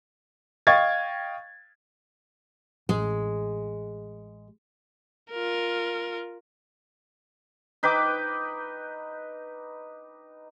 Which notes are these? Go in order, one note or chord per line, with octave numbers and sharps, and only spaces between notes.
D#5 F5 G5 C#6 G#6 A6
A1 G#3
F4 A#4
D#4 B4 G5 D6